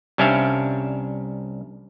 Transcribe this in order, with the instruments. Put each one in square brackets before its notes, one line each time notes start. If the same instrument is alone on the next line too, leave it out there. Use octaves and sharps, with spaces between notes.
[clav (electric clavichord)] C2 G3 C#4 D4 E5 F5